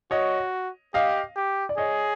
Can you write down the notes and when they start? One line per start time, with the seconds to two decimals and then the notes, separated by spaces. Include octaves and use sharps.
0.11 F#4 C#5 D#5
0.94 G4 D#5 F5
1.36 G4
1.69 D5
1.78 G#4 C#5 D#5